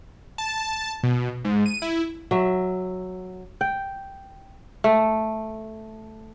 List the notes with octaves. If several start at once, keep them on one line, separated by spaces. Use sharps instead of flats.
A5
B2
G#2
D#7
E4
F#3 E5
G5
A3